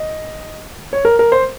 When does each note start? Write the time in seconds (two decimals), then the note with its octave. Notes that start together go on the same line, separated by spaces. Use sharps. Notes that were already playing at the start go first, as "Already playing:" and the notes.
Already playing: D#5
0.93 C#5
1.05 A#4
1.19 A#4
1.32 C5